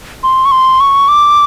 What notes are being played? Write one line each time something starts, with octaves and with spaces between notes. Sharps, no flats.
C6
C#6
C6
C#6
D6